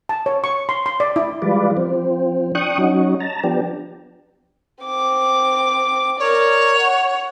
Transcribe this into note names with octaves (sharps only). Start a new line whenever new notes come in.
A5
C#5
C#6
C6
C6
D5
E4
E3 G3 G#3 F4 B4 D5
F3 C4
D4 G5 C#6 D#6 F#6
F#3 C#4 D#4 F#4
A5 A#5
F3 B3 D4 G4
C4 D6
A#4 C#5 D5
F#5